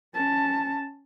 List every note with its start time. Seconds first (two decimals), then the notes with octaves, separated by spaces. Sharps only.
0.14 C#4 A5